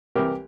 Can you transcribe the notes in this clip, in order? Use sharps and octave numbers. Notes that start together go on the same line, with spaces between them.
C2 C3 E3 G4 A#4